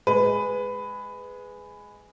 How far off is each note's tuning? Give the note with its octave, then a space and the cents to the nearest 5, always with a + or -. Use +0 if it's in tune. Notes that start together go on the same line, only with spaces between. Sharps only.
G#3 +0 B4 +15